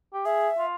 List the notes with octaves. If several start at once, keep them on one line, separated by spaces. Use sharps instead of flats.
G4
G#4 E5
F4